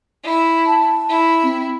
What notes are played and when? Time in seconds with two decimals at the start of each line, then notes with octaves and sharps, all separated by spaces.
0.24 E4
0.66 A5
1.08 E4
1.43 C4